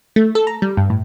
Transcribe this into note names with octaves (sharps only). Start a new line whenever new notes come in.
A3
A4
A#5
G3
G2
A2